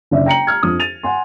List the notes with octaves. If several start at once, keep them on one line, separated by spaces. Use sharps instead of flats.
F#1 D4 D5 E5
G5 A#5 C#7 F#7
A#5 F6 G#6
F2 D4 D#6
A6 D#7 F7
F#5 G#5 C6